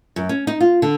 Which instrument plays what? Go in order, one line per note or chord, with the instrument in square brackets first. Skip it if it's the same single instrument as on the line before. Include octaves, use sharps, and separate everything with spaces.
[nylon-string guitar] F#2
C#4
D#4
F4
D3